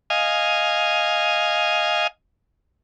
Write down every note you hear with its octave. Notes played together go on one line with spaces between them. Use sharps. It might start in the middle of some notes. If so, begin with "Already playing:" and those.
D#5 F5 G#5